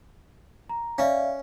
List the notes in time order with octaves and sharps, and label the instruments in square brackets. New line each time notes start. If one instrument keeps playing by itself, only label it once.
[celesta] A#5
[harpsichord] C#4 [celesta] D5 E5 F5